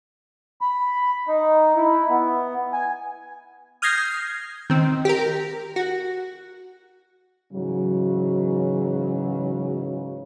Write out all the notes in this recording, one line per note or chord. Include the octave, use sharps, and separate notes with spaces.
B5
D#4
E4
B3
G#5
D#6 F6 G6 G#6 A#6 C7
D#3 C4
G4 A#4
F#4
G#2 C#3 E3 F#3